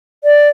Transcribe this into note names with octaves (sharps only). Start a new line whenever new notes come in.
D5